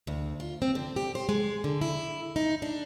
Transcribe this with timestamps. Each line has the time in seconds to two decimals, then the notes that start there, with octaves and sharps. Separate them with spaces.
0.07 D2
0.40 F4
0.62 C4
0.75 D3
0.96 G4
1.15 C5
1.29 G#3
1.64 D3
1.81 E4
2.36 D#4
2.62 D4